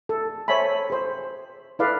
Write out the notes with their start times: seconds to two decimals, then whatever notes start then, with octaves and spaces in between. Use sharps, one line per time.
0.09 A4
0.48 C5 C#5 E5 G#5 A5 B5
0.90 G#4 C5
1.79 E4 G#4 A4 B4 D5 F5